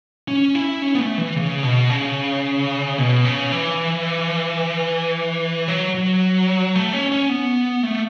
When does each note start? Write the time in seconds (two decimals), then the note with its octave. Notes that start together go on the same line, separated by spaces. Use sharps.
0.28 C#4
0.55 E4
0.82 C#4
0.95 B3
1.00 A3
1.18 E3
1.36 C#3
1.63 B2
1.90 C#3
2.98 B2
3.25 C#3
3.52 E3
5.68 F#3
5.95 F#3
6.76 A3
6.93 C#4
7.12 C#4
7.29 B3
7.83 A3